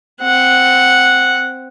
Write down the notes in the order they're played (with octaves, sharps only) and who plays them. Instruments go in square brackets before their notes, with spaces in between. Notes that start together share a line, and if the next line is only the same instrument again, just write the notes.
[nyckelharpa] C4 F#5